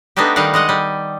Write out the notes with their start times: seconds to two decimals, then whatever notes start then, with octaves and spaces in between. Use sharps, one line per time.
0.17 A3 B3 D4 D#4 F#4 G4
0.36 D#3 G3 D#4 F5 F#5
0.54 G#3 D#5 F#5
0.69 G3